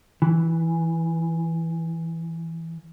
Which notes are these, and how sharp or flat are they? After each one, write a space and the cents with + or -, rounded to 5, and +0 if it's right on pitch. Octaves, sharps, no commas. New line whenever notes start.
E3 -5